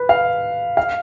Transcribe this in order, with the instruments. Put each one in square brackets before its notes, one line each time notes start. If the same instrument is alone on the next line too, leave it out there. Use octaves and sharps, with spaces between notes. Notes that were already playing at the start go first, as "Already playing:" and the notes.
Already playing: [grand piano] B4
F5
F5